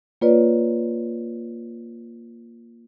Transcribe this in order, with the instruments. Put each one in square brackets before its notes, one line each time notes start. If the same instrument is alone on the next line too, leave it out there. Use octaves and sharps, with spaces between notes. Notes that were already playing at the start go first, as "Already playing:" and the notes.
[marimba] A#3 F4 B4 C#5 D5